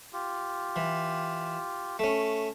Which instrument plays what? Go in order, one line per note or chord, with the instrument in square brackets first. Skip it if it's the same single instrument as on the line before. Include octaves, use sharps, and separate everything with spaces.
[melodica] F4 G4
[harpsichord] E3
A3 C#4